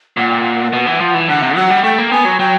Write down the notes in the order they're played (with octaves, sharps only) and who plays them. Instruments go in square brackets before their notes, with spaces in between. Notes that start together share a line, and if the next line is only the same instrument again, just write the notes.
[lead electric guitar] A#2 [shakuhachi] F#5
[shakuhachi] G5
F#5
[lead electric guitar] B2
E3
F3
E3
[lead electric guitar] D3 [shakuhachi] F#5
[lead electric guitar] C3
[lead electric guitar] F#3 [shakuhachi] F#5
[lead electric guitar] G3
[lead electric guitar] A3 [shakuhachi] G5
[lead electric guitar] A#3
[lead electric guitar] B3 [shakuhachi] G#5
[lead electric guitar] F#3
[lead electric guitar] F#3 [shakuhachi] G5